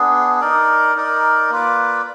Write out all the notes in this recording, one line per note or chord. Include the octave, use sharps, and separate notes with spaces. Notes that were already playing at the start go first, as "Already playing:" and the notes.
Already playing: B3 D4 G#4
D#4 A#4 D5
D#4 A#4 D5
A#3 F4 B4 D5